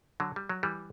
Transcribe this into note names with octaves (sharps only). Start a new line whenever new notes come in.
D3 F#3
G3
F#3
E3 G3